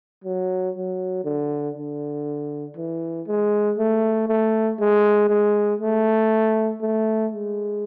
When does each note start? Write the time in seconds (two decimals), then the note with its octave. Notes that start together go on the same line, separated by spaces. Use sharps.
0.24 F#3
0.75 F#3
1.24 D3
1.75 D3
2.77 E3
3.27 G#3
3.78 A3
4.28 A3
4.80 G#3
5.29 G#3
5.81 A3
6.81 A3
7.32 G#3